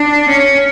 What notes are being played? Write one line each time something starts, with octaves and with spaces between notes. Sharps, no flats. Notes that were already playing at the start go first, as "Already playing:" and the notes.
Already playing: D4
C#4